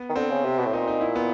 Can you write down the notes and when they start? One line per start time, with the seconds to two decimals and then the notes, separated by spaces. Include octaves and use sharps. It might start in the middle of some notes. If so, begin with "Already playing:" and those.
Already playing: B3
0.09 D#3
0.16 D3 C4
0.30 C#3
0.45 C3
0.59 B2
0.66 A2
0.73 A#2 D#4
0.88 D#4
1.01 E4
1.16 B3